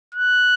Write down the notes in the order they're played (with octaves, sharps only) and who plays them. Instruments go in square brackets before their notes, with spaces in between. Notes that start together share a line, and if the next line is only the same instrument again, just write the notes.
[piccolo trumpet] F#6